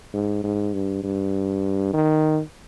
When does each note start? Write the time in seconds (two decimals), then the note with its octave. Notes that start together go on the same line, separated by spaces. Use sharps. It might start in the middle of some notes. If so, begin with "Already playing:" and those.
0.14 G#2
0.44 G#2
0.74 G2
1.04 G2
1.93 D#3